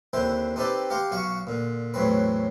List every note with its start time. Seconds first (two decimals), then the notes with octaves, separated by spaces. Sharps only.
0.13 D#2 D3 C4 E4 C5
0.56 C4 D#4 G4 A4 B4 D5
0.90 G4 F5 F#5 A#5 C6
1.11 B1 F#4 F5 F#5 C#6
1.47 A#2 D3
1.94 E2 A2 F#3 C4 B4